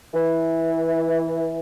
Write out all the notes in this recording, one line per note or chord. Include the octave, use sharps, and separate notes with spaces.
E3